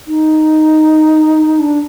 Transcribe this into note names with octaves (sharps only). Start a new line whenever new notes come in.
D#4
D4